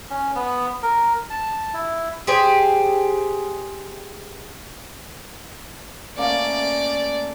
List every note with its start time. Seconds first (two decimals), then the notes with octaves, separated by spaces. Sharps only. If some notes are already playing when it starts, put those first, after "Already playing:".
0.10 C#4
0.35 B3
0.83 A#4
1.30 A5
1.74 E4
2.27 G4 G#4 C5
6.18 A3 A#3 C#4 D5